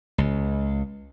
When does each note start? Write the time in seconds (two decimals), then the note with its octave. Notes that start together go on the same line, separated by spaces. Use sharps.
0.18 C#2